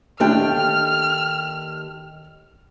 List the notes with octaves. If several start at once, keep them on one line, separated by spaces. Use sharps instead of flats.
D#2 D3 A3 D4 G5 F6